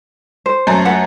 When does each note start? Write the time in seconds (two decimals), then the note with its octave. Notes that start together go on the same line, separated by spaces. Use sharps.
0.46 C5
0.67 F#2 A3 A#5
0.85 B4 F#5